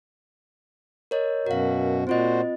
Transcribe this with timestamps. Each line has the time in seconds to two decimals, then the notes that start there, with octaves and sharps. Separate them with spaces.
1.11 A#4 C#5 D#5
1.46 F#2 B2 F#4 A#4 F5
2.07 A#2 C4 F4 F#4 C5 D#5